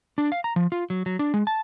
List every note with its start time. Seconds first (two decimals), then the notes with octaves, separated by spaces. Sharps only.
0.18 D4
0.32 F5
0.44 A#5
0.56 F3
0.72 F4
0.90 F#3
1.06 F#3
1.19 D4
1.34 G#3
1.47 A5